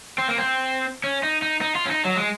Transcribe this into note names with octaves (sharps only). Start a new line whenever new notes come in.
C4
A#3
C4
C#4
D#4
D#4
D#4
F4
C#4
D#4
F#3
G#3